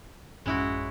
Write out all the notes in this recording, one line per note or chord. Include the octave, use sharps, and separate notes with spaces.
A1 F#2 G#3 C#4 E4 F#4